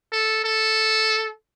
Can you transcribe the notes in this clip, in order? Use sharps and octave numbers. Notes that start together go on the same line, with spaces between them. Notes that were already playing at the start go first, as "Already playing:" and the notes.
A4
A4